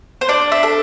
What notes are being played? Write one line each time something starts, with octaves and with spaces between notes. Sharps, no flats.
C5
D4 D5
E5
A4